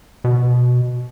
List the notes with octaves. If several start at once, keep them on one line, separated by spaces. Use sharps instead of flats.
B2